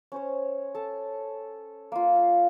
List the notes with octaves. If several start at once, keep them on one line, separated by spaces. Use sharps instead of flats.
C#4 C5 C#5
A4 A5
A#3 F4
F5